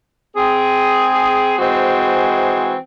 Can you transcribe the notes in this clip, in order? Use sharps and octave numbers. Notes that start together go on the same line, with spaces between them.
C4 G#4
E3 G#3 C4 F#4 C5